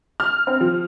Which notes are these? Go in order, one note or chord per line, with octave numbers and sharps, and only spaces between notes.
F6
C4
F3